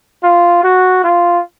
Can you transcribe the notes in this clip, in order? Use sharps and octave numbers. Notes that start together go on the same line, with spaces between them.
F4
F#4
F4